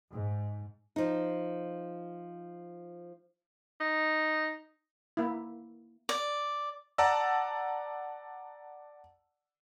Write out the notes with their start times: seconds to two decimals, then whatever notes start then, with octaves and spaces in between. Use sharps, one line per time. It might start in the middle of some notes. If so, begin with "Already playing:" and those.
0.13 G#2
0.96 F3 D#4
3.80 D#4
5.17 A#3 E4
6.09 D5
6.98 D5 F#5 A5 A#5 E6